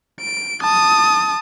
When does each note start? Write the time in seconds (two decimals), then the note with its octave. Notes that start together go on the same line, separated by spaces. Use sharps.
0.20 D7
0.61 A5 D#6